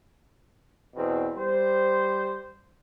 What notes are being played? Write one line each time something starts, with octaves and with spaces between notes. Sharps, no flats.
E2 B2 C4
G3 C5